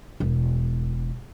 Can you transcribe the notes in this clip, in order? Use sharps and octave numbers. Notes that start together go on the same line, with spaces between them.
E1